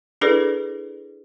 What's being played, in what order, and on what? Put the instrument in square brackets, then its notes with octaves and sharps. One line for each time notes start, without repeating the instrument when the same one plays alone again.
[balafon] D4 E4 G#4 A4 B4 D5